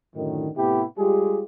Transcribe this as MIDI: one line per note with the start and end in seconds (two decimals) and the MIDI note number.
0.15 0.48 42
0.15 0.48 45
0.15 0.48 50
0.15 0.48 51
0.56 0.83 45
0.56 0.83 48
0.56 0.83 59
0.56 0.83 64
0.56 0.83 67
0.98 1.42 55
0.98 1.42 56
0.98 1.42 65
0.98 1.42 67
0.98 1.42 68